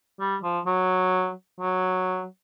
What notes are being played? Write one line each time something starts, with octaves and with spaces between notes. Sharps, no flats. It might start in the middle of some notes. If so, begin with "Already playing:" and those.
G3
F3
F#3
F#3